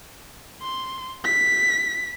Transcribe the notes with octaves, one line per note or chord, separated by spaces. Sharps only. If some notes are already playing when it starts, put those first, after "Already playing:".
C6
B6